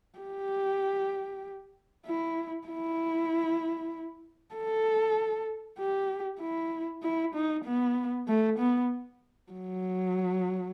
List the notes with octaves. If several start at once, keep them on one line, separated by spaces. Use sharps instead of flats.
G4
E4
E4
A4
G4
E4
E4
D#4
B3
A3
B3
F#3